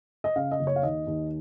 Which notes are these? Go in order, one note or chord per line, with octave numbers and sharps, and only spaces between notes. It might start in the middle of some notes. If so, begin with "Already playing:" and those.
D#5
C#3 F5
D#5
F#1
C#5
F5
D#2 D#5
D#2